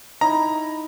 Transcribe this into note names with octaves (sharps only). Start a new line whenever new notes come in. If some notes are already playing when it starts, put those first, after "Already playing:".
D#4 E4 A#5